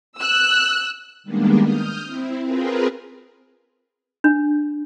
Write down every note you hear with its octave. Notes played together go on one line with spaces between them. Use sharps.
E6 F#6
D#3 G3 G#3 A#3 B3 D4
D#6 F6 G6
C4 E4
C4 F4 G#4 A#4 B4
D4